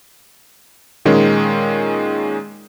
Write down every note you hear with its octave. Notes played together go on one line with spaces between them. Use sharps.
A#2 D#3 G#3 C#4